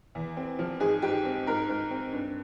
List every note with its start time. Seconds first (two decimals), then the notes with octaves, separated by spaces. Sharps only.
0.15 E2
0.37 C4
0.59 F3
0.80 G#2 G#4
1.02 G#2 G4
1.25 C4
1.47 G#2 A#4
1.69 G#2
1.91 C4
2.13 G2